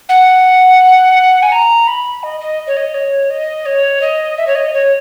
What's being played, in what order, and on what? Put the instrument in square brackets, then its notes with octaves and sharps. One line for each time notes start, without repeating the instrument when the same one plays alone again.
[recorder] F#5
G#5
A#5
B5
D#5
D#5
C#5
D#5
C#5
D#5
C#5
D#5
E5
C#5
D#5
C#5